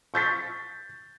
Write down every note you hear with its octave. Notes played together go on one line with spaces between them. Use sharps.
C#6 G6 A6 B6